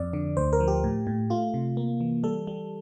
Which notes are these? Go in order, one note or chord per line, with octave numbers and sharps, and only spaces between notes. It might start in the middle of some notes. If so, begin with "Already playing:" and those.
Already playing: F2 D5
D3
D2 C5
A#4
F3
G4
A2
A2
A3 F4
C3
A#3
E3
G3 A4
G3